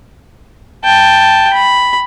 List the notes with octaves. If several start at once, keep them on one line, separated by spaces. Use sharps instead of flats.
G5 A5
B5